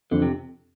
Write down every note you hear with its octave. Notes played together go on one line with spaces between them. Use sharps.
F2 D3
C3